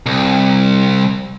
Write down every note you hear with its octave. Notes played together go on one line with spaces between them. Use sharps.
C2